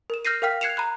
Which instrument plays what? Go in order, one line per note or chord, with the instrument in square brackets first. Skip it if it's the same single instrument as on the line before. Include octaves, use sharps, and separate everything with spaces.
[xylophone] A#4 E7
F6 G6 A#6 C7 D#7
A#4 F5 G5 F6 B6
F#6 G#6 C7 C#7 E7 F7
A#5 B5 F#6